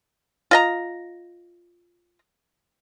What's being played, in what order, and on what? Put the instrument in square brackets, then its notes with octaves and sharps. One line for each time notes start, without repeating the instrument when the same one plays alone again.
[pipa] F4 D#5 A#5